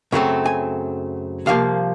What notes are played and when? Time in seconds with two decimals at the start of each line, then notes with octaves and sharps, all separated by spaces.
0.12 F#2 C#3 F#3 A3 C4
0.46 G#5
1.46 C2 C3 F3 A#3 F5